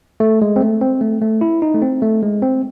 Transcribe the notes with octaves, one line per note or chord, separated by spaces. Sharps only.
A3
G#3
C4
A3
C4
A3
A3
E4
D#4
A3
C4
A3
G#3
C4